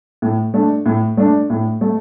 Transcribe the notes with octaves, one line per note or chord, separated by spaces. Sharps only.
A2
A3 D4
A2
A3 D4
A2
A3